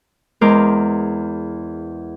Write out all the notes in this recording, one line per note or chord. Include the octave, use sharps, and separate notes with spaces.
E2 G#3 A#4 C5 D6 F6